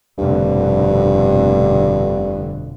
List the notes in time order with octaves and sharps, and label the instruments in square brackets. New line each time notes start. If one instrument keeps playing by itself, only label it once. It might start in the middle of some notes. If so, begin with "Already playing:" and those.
[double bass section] F1 B2 D3 [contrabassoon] G2